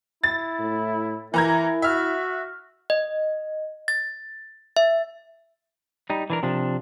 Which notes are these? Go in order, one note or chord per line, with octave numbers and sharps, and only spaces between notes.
E4 A6
A2
E3 E4 A#4 A#5 G#6
F#4 E5 F6
D#5
A6
E5
G3 D#4
E3 D4 A#4
C3 F3 D4